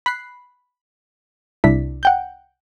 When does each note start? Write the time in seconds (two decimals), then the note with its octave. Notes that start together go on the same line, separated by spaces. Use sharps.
0.06 B5 F#6 C7
1.64 C2 D4 E4 B6
2.03 F#5 G5 G6